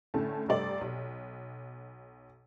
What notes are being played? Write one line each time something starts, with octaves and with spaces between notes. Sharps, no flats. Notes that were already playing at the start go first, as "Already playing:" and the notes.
A2 D3 C#4 A5
F1 G2 A3 G4 D5 F#7
B1